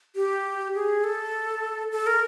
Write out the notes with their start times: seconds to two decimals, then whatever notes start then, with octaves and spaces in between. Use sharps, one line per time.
0.15 G4
0.75 G#4
1.04 A4
1.92 A4
2.07 A#4